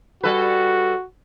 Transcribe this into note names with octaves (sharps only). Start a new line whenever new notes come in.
G3 F#4 A4 B4